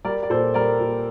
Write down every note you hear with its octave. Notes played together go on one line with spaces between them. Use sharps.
G3 A#4 D5
D5
A#2 A4 C5
G3 A#4 D5
A#2